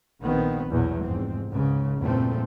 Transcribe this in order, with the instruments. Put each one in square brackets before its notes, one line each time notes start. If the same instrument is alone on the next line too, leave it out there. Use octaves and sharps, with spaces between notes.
[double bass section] A#1 D#3 B3 C4
A#1 E2 B2 F#3
F1 G#2 C4
C#2 G#2 C#3
E2 G2 A#2 F3 A3 C4